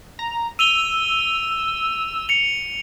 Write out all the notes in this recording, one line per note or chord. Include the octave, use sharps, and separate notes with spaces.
A#5
E6 D#7 F7 G7
C#7 F7